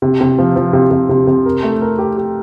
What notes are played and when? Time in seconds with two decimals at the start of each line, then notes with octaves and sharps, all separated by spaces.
0.02 C3
0.21 C3
0.38 F3
0.56 F3
0.73 C3
0.91 C3
1.09 C3
1.27 C3
1.46 A#4
1.63 A3
1.82 A#4
1.98 G4
2.17 G4